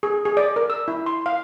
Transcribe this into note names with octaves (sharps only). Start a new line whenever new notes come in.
G#4
G#4
D5
A#4
E6
E4
C6
F5